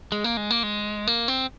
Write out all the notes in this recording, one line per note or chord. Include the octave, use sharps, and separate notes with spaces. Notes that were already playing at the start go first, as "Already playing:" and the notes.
G#3
A#3
G#3
A#3
G#3
A#3
C4